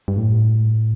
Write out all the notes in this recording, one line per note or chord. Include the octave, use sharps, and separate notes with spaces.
G2
A2